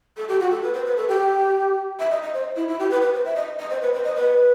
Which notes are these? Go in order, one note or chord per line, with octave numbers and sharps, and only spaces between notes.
A4
G4
F#4
A4
B4
C5
B4
A4
G4
E5
D#5
D#5
C5
E4
E4
G4
B4
B4
C5
E5
D#5
D#5
C5
B4
C5
D#5
B4